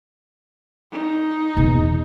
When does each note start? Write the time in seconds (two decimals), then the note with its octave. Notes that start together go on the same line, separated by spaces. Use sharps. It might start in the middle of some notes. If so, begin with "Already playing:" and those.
0.92 D#4
1.57 E2 B2